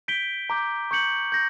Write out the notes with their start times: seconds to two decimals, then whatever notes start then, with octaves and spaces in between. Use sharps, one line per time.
0.08 G6 B6 D7 G7
0.50 A#5 D6 G6
0.91 C#6 G6 C#7 F#7
1.32 G6 A#6